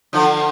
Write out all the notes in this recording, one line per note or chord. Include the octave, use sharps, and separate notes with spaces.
D3 F3